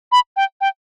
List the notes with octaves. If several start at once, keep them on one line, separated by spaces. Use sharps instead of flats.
B5
G5
G5